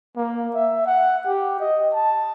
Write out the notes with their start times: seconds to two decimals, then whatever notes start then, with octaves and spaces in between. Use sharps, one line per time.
0.17 A#3
0.55 E5
0.86 F#5
1.26 G4
1.60 D#5
1.94 A5